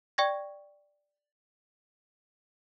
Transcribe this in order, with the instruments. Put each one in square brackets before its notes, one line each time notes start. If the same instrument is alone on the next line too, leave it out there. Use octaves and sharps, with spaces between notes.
[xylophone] D5 G5 C#6 G#6 A#6